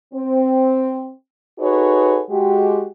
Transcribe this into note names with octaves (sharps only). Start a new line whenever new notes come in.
C4
D#4 F#4 G#4 A4 B4 C#5
G#3 F#4 G4